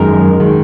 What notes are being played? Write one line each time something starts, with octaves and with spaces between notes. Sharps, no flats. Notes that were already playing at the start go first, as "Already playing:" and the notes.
Already playing: F#2 D#3 G#3 A#4
D#3 G#3